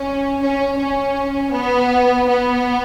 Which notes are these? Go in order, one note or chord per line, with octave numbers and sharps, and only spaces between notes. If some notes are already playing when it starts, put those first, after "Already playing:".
Already playing: C#4
C#4
C#4
B3
B3